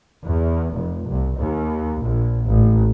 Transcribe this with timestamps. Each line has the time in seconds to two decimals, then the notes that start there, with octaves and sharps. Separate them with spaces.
0.23 E2
0.74 F1
1.08 C2
1.39 D#2
2.03 A#1
2.47 A1